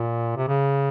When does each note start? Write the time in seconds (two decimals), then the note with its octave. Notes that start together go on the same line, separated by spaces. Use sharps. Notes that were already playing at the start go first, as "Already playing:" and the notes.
Already playing: A#2
0.36 C3
0.48 C#3